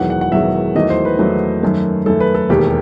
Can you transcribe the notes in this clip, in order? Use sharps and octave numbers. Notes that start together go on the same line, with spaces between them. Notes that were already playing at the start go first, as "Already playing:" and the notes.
Already playing: E1 E2 D#3 F#3 F#5
F#5
F#5
E1 E2 D#3 F#3 E5
E2 D#3 F#3 A3 D#5
C5
B4
E2 D#3 F#3 A3 B4
F#2 D#3 A3
F#2 D#3 A3 A4
B4
A4
E1 D#2 D#3 G4